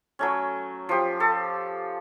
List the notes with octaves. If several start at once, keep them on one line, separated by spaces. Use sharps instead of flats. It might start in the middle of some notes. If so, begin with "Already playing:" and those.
F#3 A3 C#4
F3 G4
A4